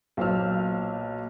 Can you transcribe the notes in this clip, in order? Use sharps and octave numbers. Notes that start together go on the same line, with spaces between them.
B1 A#2 C5 E6 F6